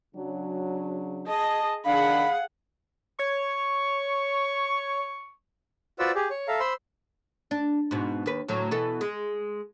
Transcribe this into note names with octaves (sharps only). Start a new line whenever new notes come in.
C#3 F#3 D4
G#4 D#5 A5
D#3 D4 G#4 F5 F#5 B5
C#5 C#6
F4 F#4 B4 C5 D5 E6
G4 G#4
C#5
A4 E5 F5 A#5
C5 B5 C6 E6
D4
G#2 B2
D#2 B4
D2 A2 F#3
B2 E3 A4
G#3